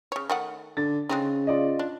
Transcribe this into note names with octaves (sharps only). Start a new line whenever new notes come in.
C#3 C#5
D#3 A3 F#5
D3 A6
C#3 G#3 C4 D#4
F4 D5 D#5
D4